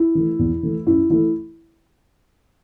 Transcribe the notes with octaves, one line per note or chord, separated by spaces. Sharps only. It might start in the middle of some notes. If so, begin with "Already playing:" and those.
Already playing: E4
E3 A3
E2
E3 A3
F#2 E4
E3 A3 E4